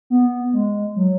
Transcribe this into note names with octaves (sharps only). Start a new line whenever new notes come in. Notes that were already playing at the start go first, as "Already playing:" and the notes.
B3
G#3
F#3